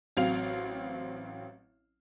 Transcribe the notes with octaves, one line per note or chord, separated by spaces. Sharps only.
A1 F#3 C4 F5 F7